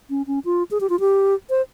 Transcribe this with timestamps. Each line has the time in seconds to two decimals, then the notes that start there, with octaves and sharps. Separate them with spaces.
0.10 C#4
0.27 C#4
0.45 F4
0.71 G#4
0.81 G4
0.90 F4
1.00 G4
1.50 C5